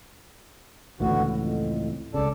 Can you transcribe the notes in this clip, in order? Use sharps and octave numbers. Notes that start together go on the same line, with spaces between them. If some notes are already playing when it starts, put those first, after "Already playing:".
C#2 A2 D3 E3 B3 F#4
F2
C#2 C#3 A4 D5 A5